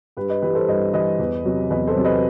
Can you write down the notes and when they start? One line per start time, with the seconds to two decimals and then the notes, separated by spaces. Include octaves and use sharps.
0.17 G2 G4 B4
0.29 B4 D#5
0.42 E3 G3 G4 B4
0.55 A4 C5
0.68 G2 B4 D#5
0.93 E3 G3 B4 D#5
1.19 E2
1.45 C3 F#3
1.70 E2 B4 D#5
1.87 A4 C5
1.96 C3 F#3
2.05 B4 D#5